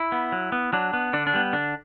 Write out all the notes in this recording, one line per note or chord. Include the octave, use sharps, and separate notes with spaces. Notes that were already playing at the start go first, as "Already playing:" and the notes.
Already playing: E4
B3
F#3
B3
F#3 D4
B3
D3 D4
D4
G3 B3
D3 D4